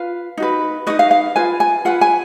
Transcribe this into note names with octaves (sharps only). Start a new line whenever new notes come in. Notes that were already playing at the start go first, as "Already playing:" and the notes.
Already playing: F4 B4 F5
D#4 F#4 B4
D#4 F#4 B4 D#5
F5
F5
F4 B4 G#5
G#5
F4 B4 F#5
G#5